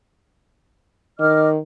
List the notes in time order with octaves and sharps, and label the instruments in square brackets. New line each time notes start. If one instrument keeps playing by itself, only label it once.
[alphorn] D#3 [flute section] D#5 D6 F6